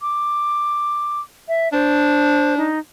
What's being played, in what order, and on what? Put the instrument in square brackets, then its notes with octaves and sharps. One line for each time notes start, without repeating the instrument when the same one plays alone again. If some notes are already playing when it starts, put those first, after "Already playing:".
[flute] D6
E5
[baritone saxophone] D4 [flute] C5
[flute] D#4